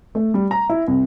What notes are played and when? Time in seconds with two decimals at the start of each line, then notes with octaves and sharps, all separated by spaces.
0.15 A3
0.34 G3
0.51 A#5
0.69 E4
0.88 C2